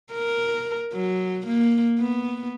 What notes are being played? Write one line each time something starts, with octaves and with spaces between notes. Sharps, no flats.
A#4
F#3
A#3
B3